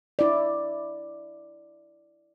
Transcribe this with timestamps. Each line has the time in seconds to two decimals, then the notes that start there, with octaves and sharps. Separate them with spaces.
0.19 E4 D5